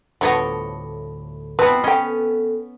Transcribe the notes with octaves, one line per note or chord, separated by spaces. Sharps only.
D2 A2 D3 F3 G3 B3 C#5 D#5
D#2 B3 C4 E4 B4 G5 A5
B3 C#4 A4 D#5 G5